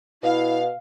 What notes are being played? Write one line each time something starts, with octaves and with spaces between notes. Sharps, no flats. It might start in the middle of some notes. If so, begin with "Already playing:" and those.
B2 E4 F5